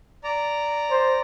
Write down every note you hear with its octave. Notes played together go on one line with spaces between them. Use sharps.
D5 A#5
C5